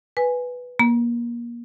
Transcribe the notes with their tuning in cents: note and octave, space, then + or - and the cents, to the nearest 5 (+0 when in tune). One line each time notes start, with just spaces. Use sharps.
B4 +0 G#5 -5
A#3 +25 A#5 +30